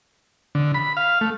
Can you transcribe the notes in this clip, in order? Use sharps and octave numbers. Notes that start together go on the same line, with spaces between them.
D3
B5
F5
A3